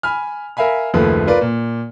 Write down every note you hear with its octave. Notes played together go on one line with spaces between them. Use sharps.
G#5 B5 F6
A#4 E5 F5 G#5 B5
F#1 D#2 F3 A3 B4
F4 A#4 B4 D5
A#2